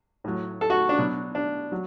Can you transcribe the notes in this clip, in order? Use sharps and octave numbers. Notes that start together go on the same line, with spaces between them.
A2 F#3
A4
F#4
D4
B2 F#3
D4
F#3